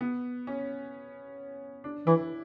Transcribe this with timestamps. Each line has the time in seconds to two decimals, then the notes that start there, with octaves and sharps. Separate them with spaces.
0.01 B3
0.47 C#4
1.84 D4
2.07 E3 E4